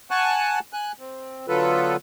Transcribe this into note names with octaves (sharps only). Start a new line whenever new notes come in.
F#5 G#5 A5 C#6 F#6
G#5 F#6
C4
D3 F#3 B3 F4 A4 B4